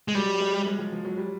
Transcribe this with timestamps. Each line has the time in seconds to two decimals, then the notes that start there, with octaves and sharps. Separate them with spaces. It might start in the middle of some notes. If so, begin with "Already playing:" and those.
0.08 G#3
0.15 F#3 G3
0.40 G#3
0.66 G#3
0.79 F3
0.92 F3
1.05 F#3
1.17 G3